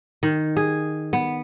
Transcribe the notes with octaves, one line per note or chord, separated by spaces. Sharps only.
D#3
G#4
B3